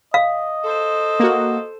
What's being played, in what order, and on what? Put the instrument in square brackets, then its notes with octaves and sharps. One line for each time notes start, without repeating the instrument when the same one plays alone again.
[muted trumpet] D#5 [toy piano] F5
[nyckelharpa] A4 C5
[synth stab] A#3 F#4